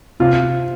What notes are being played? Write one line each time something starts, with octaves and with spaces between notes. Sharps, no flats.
C3 F4